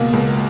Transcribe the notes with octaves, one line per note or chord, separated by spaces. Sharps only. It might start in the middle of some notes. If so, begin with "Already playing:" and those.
Already playing: C#2 B2 A#3
C#2